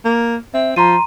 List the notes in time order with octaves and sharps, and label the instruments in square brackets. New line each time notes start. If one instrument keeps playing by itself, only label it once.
[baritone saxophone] A#3
[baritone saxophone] C4 [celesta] E5
[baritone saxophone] F3 [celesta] A#5 C6 D#7